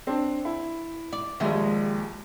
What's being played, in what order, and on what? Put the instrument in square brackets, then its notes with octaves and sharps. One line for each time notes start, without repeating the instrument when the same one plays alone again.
[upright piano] C4 D4
E4
[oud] D5
[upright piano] A#1 D#2 [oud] G#3 G4 E5